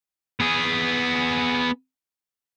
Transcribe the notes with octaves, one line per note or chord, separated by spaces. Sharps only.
B3 G#4